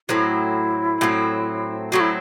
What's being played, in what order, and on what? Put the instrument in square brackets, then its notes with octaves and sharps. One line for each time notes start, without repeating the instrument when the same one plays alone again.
[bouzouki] A2 F#3 C4 [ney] E4
[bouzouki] A2 F#3 C4
[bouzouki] A2 F#3 C4 [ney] F#4
[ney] E4